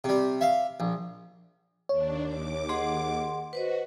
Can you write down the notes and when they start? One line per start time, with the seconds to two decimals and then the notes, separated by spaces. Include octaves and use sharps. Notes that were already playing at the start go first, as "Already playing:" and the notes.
0.04 C3 G3
0.41 E5 F5
0.80 A#1
1.89 D#2 D4 C#5
2.23 D#2 D6
2.69 G#4 D#5 F#5 C6
3.53 F#4 B4 C5 D#5